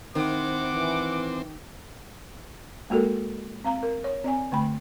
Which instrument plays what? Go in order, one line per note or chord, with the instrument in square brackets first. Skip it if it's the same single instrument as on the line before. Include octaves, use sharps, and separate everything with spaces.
[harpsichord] D#3 [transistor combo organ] C4 [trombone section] E4 C5 [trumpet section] F#5 D6
[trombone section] E3
[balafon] G#3 A#3 F#4 A4 A#4
C4 F5 A#5
A#4
C#5
C4 D5 G#5
D3 A3 B5